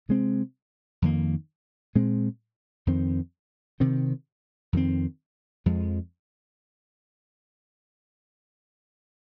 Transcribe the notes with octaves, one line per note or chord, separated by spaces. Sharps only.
C3 G#3 C4
F2 D#3 A#3
A#2 G#3 C4
F2 D#3 C4
C3 D#3 C4
F2 D#3 C4
F2 F3 G#3